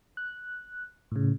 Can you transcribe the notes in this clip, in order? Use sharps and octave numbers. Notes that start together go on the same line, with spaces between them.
F#6
A2 C#3